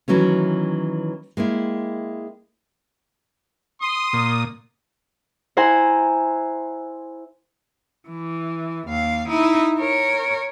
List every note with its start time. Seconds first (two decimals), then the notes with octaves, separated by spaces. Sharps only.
0.08 D#3 E3 F#3 A3 C#4
1.37 G#3 A#3 C4 E4
3.81 C6 D#6
4.13 A#2
5.57 E4 C5 F#5 G#5 A#5
8.08 E3
8.87 D#2 F5
9.28 D#4 E4
9.79 A#4 C#5